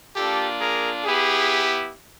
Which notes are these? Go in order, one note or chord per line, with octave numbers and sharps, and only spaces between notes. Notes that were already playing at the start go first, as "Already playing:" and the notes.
A#3 D4 F4 G4 A4
G#4 A#4
B3 E4 G4 G#4